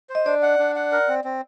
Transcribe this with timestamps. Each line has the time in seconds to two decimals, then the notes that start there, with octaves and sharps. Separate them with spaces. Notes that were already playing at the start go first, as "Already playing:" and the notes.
0.10 C5
0.15 D#5
0.26 D4 D5
0.43 F#5
0.59 D4
0.76 F#5
0.92 A#4
1.08 C4
1.24 C4